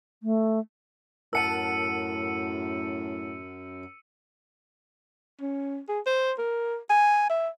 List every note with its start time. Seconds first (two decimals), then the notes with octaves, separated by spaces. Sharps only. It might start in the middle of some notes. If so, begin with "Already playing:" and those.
0.23 A3
1.33 F#2 A2 A#4 F#5 A5 E6 C#7 D#7
5.41 C#4
5.89 G#4
6.06 C5
6.38 A#4
6.90 G#5
7.29 E5